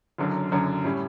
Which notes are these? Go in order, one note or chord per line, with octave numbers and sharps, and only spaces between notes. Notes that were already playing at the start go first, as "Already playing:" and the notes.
F#1 F#2 D3 F#3
F#1 F#2 D3 F#3
A2 G3 C#4